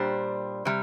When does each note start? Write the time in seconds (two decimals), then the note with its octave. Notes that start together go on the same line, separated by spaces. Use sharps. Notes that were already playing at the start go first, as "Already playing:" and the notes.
Already playing: A#2 G3 D4 G4 C5
0.65 C3 G3